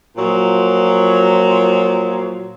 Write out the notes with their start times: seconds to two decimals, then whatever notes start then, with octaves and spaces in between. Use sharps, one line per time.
0.17 A#2 F3 F#3